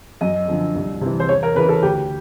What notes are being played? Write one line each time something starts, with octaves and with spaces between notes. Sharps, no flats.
F#2 D#5
D3 F3
C2
C3 E3
C5
E2 C#5
A#4
C#3 E3 B4
A4
D2 G4